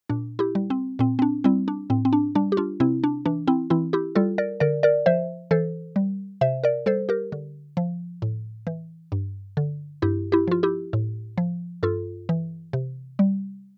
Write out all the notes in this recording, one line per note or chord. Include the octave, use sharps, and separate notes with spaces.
A#2 D4
E4 G4
G3
C4
A#2 C4
C4
D4
G3 C4 E4
D4
A2 C4
C4
D4
G3 D4
G4
D4 F4
C3 C4 E4
D4
E3 D4
C4 E4
E3 C4 E4
E4 G4
G3 F4 A4
A#4 D5
D3 A#4 D5
A#4 D5
F3 C5 E5
E3 A4 C5
G3
C3 C5 E5
A#4 D5
G3 A4 C5
G4 A#4
D3
F3
A2
E3
G2
D3
G2 E4 G4
E4 G4
F3 F4
E4 G4
A2
F3
G2 F4 A4
E3
C3
G3